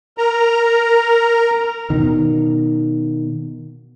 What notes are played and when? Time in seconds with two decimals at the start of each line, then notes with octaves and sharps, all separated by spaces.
0.18 A#4 A#5
1.90 B2 D#3